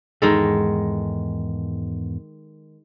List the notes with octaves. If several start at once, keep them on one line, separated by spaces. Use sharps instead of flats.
E2 G#2 D#3 G#3 A4